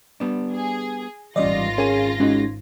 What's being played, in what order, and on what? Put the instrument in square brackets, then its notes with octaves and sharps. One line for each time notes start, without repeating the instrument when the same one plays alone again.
[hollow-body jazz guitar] G3 B3 D4
[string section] G#4
[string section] G#1 F4 A#6 [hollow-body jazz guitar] E3 G3 C#4 [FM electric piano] D5 D#5
[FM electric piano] C#4 G#4 A#4 [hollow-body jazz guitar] C#5 G#5
[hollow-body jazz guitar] G#3 F#4 G#4 [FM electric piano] C#4 D#4